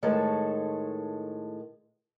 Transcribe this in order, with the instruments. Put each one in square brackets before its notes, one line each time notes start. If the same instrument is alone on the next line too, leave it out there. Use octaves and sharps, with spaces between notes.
[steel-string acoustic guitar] A2 D#3 G#3 A4 B4 A5